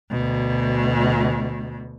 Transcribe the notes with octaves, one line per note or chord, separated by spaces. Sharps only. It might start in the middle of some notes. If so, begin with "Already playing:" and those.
D2 B2